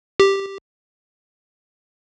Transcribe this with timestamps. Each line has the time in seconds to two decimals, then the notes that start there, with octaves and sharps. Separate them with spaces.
0.20 G4